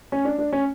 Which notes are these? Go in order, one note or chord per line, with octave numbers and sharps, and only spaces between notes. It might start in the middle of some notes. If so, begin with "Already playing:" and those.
C#4
D4
D4
C#4